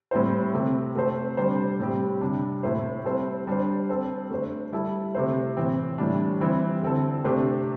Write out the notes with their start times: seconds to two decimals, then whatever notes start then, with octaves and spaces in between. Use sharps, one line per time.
0.11 A2 G3 C4 E4 C5
0.54 C3 A3 C4
0.95 A3 C4 A4 C5
1.37 C3 G3 D4 C5
1.79 A2 G3 C4 G4
2.21 C3 G3 D4
2.63 A2 A3 E4 C5
3.05 G3 C4 A4 C5
3.47 G3 D4 C5
3.89 G3 C4 A4 C5
4.30 A3 D4 C5
4.72 G3 E4 A4
5.15 C3 A3 E4 C5
5.57 A2 E3 C4
5.98 A2 E3 G3 D4
6.41 E3 G3 C4 E4
6.82 D3 C4 A4
7.24 C3 A3 D4 G4 C5